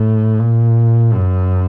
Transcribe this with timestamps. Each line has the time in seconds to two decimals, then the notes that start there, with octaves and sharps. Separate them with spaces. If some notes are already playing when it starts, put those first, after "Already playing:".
Already playing: A2
0.39 A#2
1.14 F#2